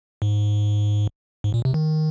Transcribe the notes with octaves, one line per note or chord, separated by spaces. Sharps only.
G#2
G#2
A#2
C3
D#3